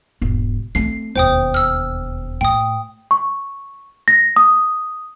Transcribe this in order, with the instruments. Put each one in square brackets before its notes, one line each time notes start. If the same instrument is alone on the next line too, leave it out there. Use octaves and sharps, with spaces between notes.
[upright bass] E1 G#2
[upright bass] A3 C4 [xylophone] C7
[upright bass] E1 D#2 [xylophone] C5 G5 D#6
[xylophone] E6 F6
[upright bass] A2 [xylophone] G5 D#6
[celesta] C#6
A#6
D#6